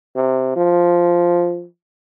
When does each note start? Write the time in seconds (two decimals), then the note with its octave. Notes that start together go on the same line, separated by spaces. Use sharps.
0.16 C3
0.56 F3